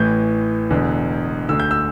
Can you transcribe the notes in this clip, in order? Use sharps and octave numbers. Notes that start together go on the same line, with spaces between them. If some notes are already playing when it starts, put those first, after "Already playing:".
Already playing: A1 A2 E3 G6
E1 E2 D3
D2 D3 E6
G6
E6